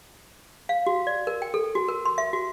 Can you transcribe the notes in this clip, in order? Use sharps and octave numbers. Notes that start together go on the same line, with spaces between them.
F5
F#4
D5
A#4
G5
A4
F#4
A#4
C6
E5
F#4